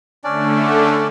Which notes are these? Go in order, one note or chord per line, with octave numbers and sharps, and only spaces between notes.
D3 A3 C#4 D4 D5